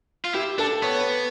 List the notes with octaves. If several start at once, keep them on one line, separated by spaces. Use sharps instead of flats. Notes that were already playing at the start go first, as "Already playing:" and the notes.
F4
E4 G4
D4 A4
B3 C#5